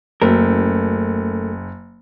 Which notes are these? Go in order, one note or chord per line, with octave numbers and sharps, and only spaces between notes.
F#1 A3 A#4